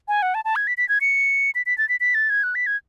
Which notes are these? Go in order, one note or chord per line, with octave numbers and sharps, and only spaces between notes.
G#5
F#5
A5
A5
G#6
B6
B6
G#6
C#7
B6
B6
A6
B6
B6
A6
G#6
F#6
B6
G#6